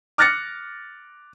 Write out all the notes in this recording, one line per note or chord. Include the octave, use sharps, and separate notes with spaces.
D6 F6 F#6 A6 A#6 C#7